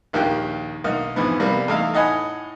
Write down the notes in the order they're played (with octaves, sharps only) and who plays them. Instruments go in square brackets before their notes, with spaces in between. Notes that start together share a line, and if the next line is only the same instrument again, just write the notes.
[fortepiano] A#1 D#2 A#3 G4 G5 F#6
B1 A#3 D#4 F#5 F6
F2 G#2 E3 B3
C3 G3 A#3 B3
E2 A3 D#4 E4 F5
A2 D#4 D#5 F#5 G#5 B5